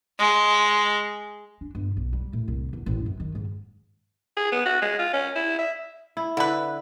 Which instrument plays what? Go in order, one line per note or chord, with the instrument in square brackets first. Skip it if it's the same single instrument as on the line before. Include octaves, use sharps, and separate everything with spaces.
[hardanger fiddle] G#3
[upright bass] D4
G1
B1
G3
A2
C2
E2
A1
F#2
D#3
G#2
[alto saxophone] G#4
B3
F#4
G#3
F4
C#4
E4
E5
[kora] E4
[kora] D3 [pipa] E4 B4